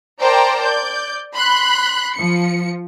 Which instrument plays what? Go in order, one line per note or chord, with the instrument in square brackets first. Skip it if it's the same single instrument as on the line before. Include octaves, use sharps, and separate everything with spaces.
[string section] A#4 C5 D5 G5 A5 A#5
D5 G6
B5 C6 F#6
F3 C#7